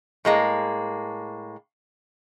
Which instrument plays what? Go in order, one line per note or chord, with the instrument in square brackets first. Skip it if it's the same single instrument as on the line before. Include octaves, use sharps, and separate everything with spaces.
[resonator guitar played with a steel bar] A2 G#3 A#3